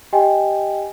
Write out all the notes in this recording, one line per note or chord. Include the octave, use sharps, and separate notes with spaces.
G4 D#5 G5 G#5